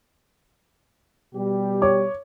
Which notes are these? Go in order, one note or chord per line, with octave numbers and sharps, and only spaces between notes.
B2 G3 G4
C#5 D6